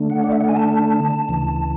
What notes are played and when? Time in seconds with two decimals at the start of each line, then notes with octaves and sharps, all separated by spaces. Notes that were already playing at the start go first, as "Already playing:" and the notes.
Already playing: D3 A3 D4
0.10 F#5
0.24 D5
0.32 E5
0.40 F#5
0.49 G#5
0.56 A5
1.29 D2 C#3 E3